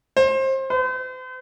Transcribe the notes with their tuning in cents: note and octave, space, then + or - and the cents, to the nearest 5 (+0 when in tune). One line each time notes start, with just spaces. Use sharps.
C5 +25
C5 -45